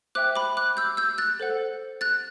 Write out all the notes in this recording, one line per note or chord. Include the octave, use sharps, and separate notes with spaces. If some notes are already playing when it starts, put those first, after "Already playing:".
C5 E5 G5 D6 F#6
B5 D6
D6 F#6
E6 G6
E6 G6
F#6 A6
A4 C5 F#5
F#6 A6